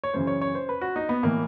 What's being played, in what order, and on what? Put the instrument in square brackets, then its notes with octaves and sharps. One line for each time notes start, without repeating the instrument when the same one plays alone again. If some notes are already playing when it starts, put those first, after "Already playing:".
[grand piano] C#5
F#2 C#3 E3 C5
C#5
C#5
C5
B4
F#4
D#4
B3
A2 E3 A#3